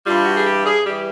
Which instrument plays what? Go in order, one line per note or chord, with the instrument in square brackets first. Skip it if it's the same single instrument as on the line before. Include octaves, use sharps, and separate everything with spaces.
[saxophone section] G2 E3 G3 F4
F#4
G#4
G4
G#4
E3 G3 G4